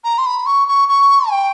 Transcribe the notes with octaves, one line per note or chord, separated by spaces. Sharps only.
A#5
C6
B5
C#6
C#6
C#6
G5